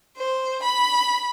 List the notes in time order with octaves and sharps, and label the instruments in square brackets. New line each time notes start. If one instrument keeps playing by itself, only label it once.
[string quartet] C5
B5